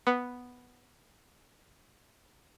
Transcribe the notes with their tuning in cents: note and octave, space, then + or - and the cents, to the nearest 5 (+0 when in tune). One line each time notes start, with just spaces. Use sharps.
B3 +0